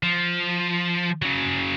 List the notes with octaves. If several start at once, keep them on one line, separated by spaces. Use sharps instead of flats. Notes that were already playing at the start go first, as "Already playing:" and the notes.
F3
C#3 F#3